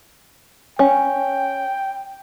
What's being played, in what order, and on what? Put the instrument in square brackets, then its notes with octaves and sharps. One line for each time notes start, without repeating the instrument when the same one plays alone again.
[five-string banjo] C#4 [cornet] G5